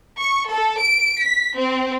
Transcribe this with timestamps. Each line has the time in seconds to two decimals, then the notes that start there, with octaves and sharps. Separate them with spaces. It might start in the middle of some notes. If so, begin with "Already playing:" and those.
0.20 C#6
0.50 A4
0.80 D7
1.24 B6
1.57 C4